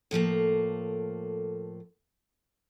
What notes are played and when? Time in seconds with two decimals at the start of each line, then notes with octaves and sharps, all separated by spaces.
0.11 A2 F3 A3 A#3